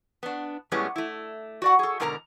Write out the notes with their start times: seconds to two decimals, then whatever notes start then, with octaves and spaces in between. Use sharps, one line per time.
0.23 B3 D4
0.72 A2 G3 G#3 B3 C#4
0.96 A3 E4
1.62 F#4 D5 F#5
1.79 G#4 A4
2.00 G#2 B2 D3 A#4 G#5 A#5